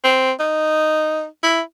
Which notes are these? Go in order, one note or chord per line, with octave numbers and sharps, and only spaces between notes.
C4
D#4
E4